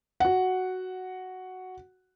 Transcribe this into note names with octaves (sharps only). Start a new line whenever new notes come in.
F#4 F#5